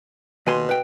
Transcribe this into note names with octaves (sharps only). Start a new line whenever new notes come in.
D#2 B2 G#5 C6
B4 G5